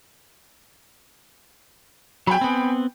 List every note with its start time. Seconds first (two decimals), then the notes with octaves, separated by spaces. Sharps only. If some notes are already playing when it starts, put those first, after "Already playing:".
2.27 F#3 G5 G#5 B5
2.41 B3 C4